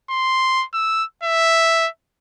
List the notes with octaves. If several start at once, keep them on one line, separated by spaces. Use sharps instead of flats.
C6
E6
E5